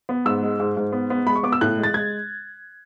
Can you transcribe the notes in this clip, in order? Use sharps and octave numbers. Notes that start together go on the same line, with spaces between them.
B3
G#2 E6
G#3
G#2
G#2
B3
B3
G#3 B5
C#6
B3 D6
E6
A2 F#6
G#3
A6
G#3 G#6